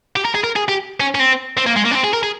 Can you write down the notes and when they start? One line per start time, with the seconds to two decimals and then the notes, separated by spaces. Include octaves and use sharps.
0.16 G4
0.25 A#4
0.35 G#4
0.44 A#4
0.56 G#4
0.68 G4
1.00 C#4
1.15 C#4
1.19 C4
1.57 C4
1.67 A#3
1.76 G#3
1.85 A#3
1.91 C#4
1.95 C4
2.04 G#4
2.13 A#4
2.23 G#4